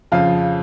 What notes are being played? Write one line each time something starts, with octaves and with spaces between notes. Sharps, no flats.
F2 C#3 F3 F5